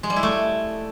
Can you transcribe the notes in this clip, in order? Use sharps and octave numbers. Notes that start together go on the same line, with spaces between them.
G#3
G3
E4
A3